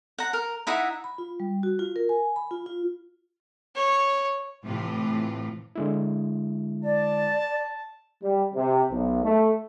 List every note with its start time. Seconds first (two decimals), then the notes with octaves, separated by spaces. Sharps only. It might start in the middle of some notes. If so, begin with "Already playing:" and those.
0.18 F#5 A#5
0.33 A#4
0.67 D#4 E4 E5 F#5
1.04 B5
1.18 F4
1.40 G3
1.63 F#4
1.79 F4
1.96 A#4
2.09 G#5
2.36 B5
2.51 F4
2.66 F4
3.75 C#5
4.64 A2 C3 E3 F4
5.76 D3 G#3 E4
6.84 D5 A5
8.23 G3
8.55 C3
8.91 B1
9.24 A3